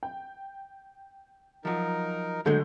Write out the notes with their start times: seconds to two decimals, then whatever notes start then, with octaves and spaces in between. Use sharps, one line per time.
0.03 G5
1.65 F3 F#3 D#4 A#4
2.46 D3 F#3 G#3 A3 G6